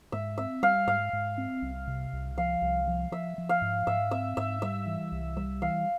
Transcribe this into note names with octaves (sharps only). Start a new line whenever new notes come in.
G#2 E5
C4 E5
G3 F5
G#2 F5
G#2
C4
C2
C3
C2
F3 F5
C2
F3
F3 E5
F3
F5
G#2
G#2 E5
C4 E5
G#2 E5
G3 E5
E3
C2
G3 E5
E3 F5